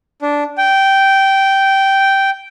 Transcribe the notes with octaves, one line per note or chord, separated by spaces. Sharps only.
D4
G5